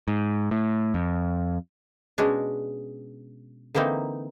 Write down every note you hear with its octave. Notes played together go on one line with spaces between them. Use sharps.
G#2
A2
F2
B2 G#3 C#4 D4
D3 E3 A#3 C4 D#4